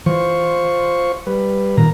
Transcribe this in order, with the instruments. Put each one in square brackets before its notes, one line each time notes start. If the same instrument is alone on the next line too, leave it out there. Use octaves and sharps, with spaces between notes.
[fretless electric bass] E3 [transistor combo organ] F4 C5 C#6
[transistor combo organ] G3 B4
[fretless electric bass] A#2 D#3 [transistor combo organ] A#4 A#5